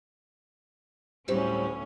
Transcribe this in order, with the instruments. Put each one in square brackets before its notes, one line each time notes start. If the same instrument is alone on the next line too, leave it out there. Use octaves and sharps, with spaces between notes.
[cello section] D2 A2 C#4 [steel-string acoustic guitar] F#3 G3 C4